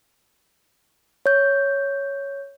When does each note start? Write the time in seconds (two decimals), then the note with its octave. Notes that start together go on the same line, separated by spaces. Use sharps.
1.26 C#5 G6